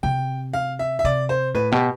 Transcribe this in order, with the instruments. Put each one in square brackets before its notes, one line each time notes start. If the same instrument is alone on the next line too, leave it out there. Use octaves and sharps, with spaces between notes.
[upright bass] C3 [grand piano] G5
[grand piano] F5
E5
E5
[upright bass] C3 [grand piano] D5
[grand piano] C5
[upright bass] A2 [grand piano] B4
[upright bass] B2 [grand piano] G4